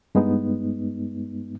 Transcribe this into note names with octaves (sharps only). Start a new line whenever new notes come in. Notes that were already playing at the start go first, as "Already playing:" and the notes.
G2 G#3 B3 D#4